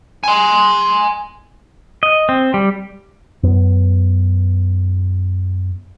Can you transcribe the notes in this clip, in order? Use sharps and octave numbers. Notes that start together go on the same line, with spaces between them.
G#5 C6
D#5
C4
G3
F#2 B3